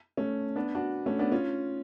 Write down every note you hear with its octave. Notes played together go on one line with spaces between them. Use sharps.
A3 C#4
B3 D4
D4 F#4
A3 C#4
B3 D4
C#4 F4